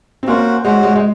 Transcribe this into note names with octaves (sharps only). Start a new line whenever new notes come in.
C4
A#3 C#4 F#4 C5 F#5
G#3 C#4 F#4 C5 F#5
G#3
G#3